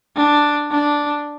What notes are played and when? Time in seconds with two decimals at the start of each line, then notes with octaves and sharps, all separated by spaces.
0.17 D4
0.71 D4